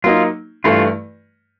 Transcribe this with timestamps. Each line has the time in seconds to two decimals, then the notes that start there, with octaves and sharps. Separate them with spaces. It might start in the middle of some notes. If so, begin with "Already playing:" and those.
0.04 F#3 A#3 D#4 F4
0.64 G2 E3 A3 F4